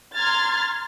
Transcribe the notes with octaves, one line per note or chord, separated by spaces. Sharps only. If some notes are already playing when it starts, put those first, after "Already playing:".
A#5 C6 F6 G#6 A6